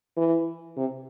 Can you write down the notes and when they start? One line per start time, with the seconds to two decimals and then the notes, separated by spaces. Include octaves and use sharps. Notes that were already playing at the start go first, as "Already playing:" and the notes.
0.17 E3
0.77 C3